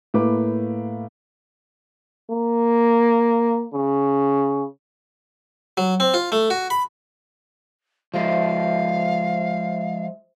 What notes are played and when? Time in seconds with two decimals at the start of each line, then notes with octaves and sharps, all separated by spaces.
0.14 A2 A#3 B4 D6
2.30 A#3
3.73 C#3
5.77 F#3
6.00 C4
6.14 F4
6.32 A3
6.50 F#4
6.70 B5
8.14 F3 G#3 C5 E5 F5